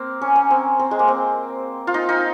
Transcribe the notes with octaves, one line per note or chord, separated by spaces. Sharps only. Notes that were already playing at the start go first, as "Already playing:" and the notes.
Already playing: A#3 C4
C#4
C#4
C4
C4
G#3
A#3
C4
F4
D#4
D#4